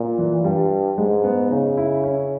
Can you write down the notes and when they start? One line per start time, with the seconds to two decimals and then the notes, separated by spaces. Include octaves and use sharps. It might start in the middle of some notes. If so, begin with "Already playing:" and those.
Already playing: A#2
0.18 E3
0.40 E3
0.44 G2 G3
0.98 G#2 G#3
1.24 B3
1.51 C#3 D#4
1.77 E4
2.04 C#4